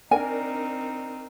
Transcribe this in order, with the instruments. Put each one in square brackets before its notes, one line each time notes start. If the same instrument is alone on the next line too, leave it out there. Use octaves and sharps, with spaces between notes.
[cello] C4 D#4 [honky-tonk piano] D4 A#4 [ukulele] G#5